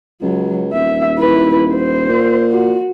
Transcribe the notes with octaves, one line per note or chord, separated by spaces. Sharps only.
C#2 F#3
D#1 E5
E4 B4
C5
A#2
F#4